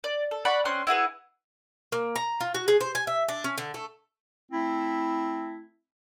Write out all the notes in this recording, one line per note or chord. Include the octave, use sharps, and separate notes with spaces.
D5
A4
D5 F#5 B5 C#6
C4 C#4 C6 F#6
E4 F#4 G#4 B4
A#3
A#5
F4
F#4
G#4
C5
G#5
E5
D4
C#4
D3
A3
A3 C4 E4